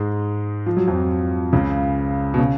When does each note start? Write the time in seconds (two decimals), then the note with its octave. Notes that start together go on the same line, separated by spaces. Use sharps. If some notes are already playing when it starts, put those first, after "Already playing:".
Already playing: G#2 G#3
0.66 F3
0.77 F#3
0.87 F2 F3
1.53 C#2 C#3
2.34 B2
2.39 C#3